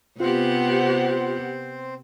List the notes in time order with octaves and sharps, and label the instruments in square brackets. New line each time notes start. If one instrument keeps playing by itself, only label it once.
[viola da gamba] C3 B3 [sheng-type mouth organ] C4 C5 [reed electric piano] F4 [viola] G4 F#5